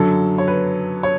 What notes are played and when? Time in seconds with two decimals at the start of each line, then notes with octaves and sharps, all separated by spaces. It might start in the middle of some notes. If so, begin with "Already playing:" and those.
Already playing: F#2 D3 F#3 A4
0.38 C#5
0.48 B4
1.03 C#5